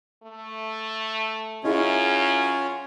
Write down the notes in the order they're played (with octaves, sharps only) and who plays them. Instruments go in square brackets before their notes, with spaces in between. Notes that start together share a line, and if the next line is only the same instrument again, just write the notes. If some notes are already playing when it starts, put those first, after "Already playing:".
[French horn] A3
[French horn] F#2 [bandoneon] C#4 F4 C#5 [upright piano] E4 G#4 D#5